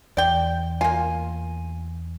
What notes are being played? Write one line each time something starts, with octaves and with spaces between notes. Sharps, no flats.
E2 D5 G5
A#3 F4 G#5